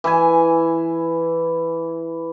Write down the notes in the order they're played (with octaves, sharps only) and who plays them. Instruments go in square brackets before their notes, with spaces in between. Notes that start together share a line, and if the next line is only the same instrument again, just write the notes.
[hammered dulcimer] E3 G#5